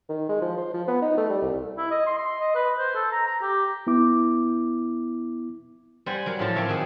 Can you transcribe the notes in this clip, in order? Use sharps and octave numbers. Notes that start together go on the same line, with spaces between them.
D#3
G#3
F3
C5
F3
B3
D#4
A3
G3
C2
E4
D#5
C6
C6
D#5
B4
C5
A4
A#5
A#5
G4
B3 E4 D6
G3 C5 F#5 G#5
F#3 A#4 F5
A2 F3 F4 A5
A#3 C4 C#5 E5 F5
D#3 F#4 G#4